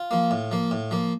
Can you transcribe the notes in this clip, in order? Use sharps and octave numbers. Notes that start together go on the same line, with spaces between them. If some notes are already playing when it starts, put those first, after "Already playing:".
Already playing: F4
F3 A#3
A2
F3 A#3
A2
F3 A#3